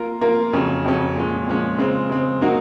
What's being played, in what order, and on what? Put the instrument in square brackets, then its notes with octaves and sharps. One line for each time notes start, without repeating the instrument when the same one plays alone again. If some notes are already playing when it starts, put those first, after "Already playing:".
Already playing: [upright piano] A#3 F4 A#4
A#3 F4 A#4
F2 C#3 F#3 C#4
F2 C#3 F#3 C#4
A#2 F3 G#3 C#4
A#2 F3 G#3 C#4
C#3 G#3 C4
C#3 G#3 C4
F#3 A#3 D#4 F#4